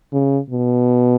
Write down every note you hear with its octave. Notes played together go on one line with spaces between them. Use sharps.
C#3
B2